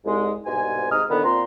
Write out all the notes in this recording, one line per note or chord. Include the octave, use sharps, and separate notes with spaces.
C2 G#2 G#3
C2 G#2 B2 C5 G#5
G#2 C3 D#4 D#6 F6
F2 A#2 D3 D#3 B3
A#2 C4 A#5 C6